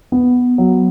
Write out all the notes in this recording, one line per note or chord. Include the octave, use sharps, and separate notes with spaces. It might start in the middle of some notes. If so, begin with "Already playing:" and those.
B3
F#3